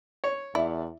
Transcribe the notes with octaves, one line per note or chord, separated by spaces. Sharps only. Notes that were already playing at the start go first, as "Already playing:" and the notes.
C#5
E2 E4 D5 E5